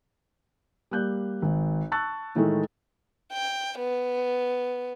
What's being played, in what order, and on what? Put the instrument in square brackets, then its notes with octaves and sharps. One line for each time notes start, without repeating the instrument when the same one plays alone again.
[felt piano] G3 A#3 F#6 G6
G#1
A5 C#6 E6 F#6 A6
A2 D#3 E3 G#3 A3
[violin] G5
B3